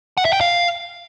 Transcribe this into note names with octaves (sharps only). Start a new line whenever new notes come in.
F#5
E5
G5
F5